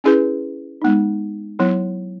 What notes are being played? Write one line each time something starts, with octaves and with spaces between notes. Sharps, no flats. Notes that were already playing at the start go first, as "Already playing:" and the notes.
C#4 E4 G#4 B4
G#3 B3 D#4
F#3 B3 E4